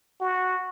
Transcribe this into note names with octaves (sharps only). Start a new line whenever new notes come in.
F#4